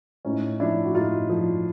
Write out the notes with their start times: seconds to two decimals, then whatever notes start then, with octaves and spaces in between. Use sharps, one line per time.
0.25 A2 C#4 D#4
0.60 F3 D4 E4
0.85 F#4
0.95 A2 D#4 F4
1.29 F3